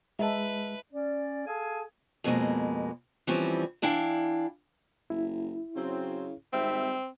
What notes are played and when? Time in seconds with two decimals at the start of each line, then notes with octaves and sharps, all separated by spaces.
0.19 G#3 E4 B4 D#5 E5 A5
0.92 C#4 D5
1.46 G#4 A4 F5 G#5 A5
2.24 F2 B2 D#3 G#3 A#3
3.27 E3 F3 G3 C4 C#4
3.82 E3 D4 E4 F5 G5
5.10 F#1 E4
5.76 C#3 F#3 C4
6.53 G#1 G3 C4 D#4 E5